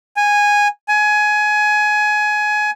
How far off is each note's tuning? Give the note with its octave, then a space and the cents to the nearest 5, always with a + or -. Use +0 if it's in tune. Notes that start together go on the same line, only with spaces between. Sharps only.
G#5 -10
G#5 +20